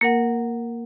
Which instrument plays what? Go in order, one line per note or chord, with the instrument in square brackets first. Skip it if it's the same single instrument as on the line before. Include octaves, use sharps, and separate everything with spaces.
[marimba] A#3 A#4 F#5